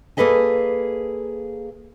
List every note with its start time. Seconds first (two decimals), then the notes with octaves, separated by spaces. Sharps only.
0.17 A#3 G#4 A4 B4 D#5 G#5